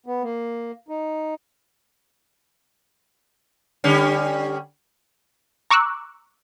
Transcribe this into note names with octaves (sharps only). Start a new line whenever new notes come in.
B3
A#3
D#4
D3 G3 C#4
A#5 C#6 D6 E6 F#6